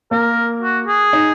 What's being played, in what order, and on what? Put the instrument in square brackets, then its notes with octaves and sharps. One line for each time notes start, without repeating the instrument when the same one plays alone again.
[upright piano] A#3 [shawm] A#4
[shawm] F#4
G#4
[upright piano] D#4